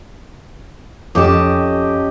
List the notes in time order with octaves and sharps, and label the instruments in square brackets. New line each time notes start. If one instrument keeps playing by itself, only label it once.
[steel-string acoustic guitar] F2 A5 [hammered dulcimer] C#4 G4 D#5